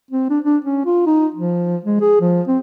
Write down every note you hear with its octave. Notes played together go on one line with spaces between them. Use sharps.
C4
D4
D4
C#4
F4
D#4
F3
G#3
G#4
F3
C4